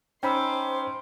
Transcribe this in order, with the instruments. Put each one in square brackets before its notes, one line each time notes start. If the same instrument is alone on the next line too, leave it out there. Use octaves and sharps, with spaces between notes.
[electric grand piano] C#4 D#4 [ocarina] C5 [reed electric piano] G5 B5 E6 [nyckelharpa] C6 D6